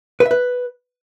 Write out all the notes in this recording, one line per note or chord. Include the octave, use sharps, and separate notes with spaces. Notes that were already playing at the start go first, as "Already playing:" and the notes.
B4
E5
B4